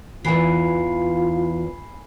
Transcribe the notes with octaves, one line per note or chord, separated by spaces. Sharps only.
E2 E3 F4 G#5 B5 C7